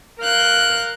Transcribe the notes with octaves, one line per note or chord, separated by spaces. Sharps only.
A#4 F5 F#6 G6